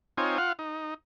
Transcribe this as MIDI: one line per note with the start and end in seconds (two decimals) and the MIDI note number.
0.18 0.38 60
0.18 0.38 63
0.18 0.38 65
0.18 0.38 73
0.18 0.38 80
0.38 0.52 65
0.38 0.52 77
0.38 0.52 78
0.59 0.94 63